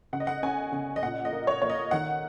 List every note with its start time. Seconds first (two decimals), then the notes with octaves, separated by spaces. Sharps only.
0.13 C#3 F#5
0.20 D#5
0.27 F#5
0.43 C#4 G#5
0.72 C#3
0.96 D#5
1.02 A#2 F#5
1.25 D#5
1.32 A#3
1.47 C#5
1.62 A#3 C#5
1.70 D#5
1.91 D#3 F#5